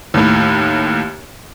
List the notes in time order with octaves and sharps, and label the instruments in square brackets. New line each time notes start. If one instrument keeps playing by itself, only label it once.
[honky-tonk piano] D#2 A2